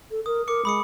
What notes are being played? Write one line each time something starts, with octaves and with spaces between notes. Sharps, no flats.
A4
A#4 D#6
A#4 D6 C#7
G#3 B5 D#6 C#7